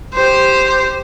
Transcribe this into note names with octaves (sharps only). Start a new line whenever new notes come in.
G4 C5